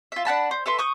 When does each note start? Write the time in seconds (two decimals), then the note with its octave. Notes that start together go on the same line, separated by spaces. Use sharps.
0.12 F4 E5
0.25 D4 F#5 A5 B5
0.51 C5
0.66 A4 B4 E5 C6
0.79 C#6 D#6 G6